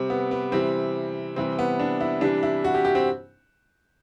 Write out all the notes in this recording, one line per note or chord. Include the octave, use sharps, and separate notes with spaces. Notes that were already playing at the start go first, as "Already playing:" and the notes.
Already playing: C3 G3 C4
B3
B3
C3 E3 G3 C4
C3 E3 G3 C4
B3
D4
E4
C3 E3 G3 D4
E4
F#4
G4
G4
C4